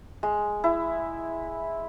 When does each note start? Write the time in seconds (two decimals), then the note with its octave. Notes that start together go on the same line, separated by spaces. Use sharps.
0.23 G#3
0.64 E4